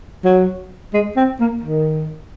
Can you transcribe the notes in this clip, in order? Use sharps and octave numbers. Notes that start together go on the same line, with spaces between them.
F#3
G#3
C4
A#3
D#3